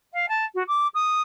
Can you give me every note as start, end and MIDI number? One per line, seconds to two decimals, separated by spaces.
0.13 0.25 77
0.28 0.44 81
0.54 0.62 66
0.67 0.87 86
0.94 1.21 87